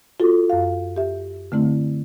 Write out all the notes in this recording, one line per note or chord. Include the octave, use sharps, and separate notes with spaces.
F4 F#4 A4
F#2 F5
G4 E5
D3 A3 C4 E4